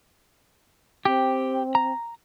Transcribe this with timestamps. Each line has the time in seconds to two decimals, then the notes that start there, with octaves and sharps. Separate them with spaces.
1.05 C4 G4
1.75 A#5